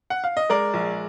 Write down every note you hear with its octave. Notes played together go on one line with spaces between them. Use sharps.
F#5
F5
D#5
G#3 A#4 D5
A#1